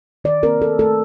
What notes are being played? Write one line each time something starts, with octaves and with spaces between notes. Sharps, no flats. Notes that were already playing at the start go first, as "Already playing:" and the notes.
D#3 D5
C4 A#4
C4 A4
A3 A4